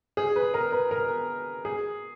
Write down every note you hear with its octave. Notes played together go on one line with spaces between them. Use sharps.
G#4
B4
A#4
B4
A#4
G#4